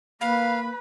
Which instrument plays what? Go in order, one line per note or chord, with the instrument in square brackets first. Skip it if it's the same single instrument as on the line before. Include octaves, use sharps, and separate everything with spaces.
[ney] A#3 [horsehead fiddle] B4 B5 [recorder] F5